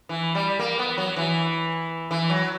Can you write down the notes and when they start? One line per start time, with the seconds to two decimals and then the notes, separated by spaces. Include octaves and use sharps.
0.09 E3
0.35 G3
0.59 A#3
0.79 B3
0.98 F#3
1.16 E3
2.11 E3
2.30 F#3